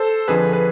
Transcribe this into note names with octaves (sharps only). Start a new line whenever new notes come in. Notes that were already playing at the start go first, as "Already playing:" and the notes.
Already playing: A4 C5
F2 D3 F3 G#4 B4
B4